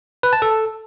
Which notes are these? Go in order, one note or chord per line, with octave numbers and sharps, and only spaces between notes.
B4
A5
A4